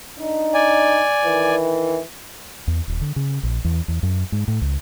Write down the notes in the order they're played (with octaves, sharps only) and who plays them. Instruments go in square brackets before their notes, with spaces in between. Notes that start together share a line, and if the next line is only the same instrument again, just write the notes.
[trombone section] D4 D#4
[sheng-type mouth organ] D5 G#5
[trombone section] D#3 E3
[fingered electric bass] E2
D#1
D3
C#3
A#1
E2
E2
F#2
G#2
A2
C#2